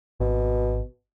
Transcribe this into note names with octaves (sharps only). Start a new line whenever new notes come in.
G#1 B2